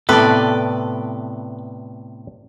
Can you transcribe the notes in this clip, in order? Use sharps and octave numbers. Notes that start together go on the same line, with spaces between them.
A2 C3 B3 A4 B4 D5